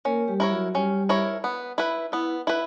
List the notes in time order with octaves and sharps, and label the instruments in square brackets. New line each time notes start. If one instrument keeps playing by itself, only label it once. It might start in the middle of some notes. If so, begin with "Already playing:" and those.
[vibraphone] A#3 A#4 [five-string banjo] C#4
[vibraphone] G3 G4
[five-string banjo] E4 A#4 C#5
[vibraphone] F#3 F#4
[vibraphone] G3 G4 [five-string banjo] C#4
[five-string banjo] E4 A#4 C#5
B3
E4 B4
[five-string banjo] B3 [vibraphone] E4
[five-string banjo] E4 B4